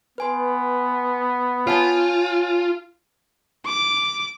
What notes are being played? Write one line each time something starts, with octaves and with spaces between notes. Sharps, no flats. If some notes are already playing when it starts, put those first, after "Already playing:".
B3 B4 G#5 C6
F4 C#5 G#5 A5
D6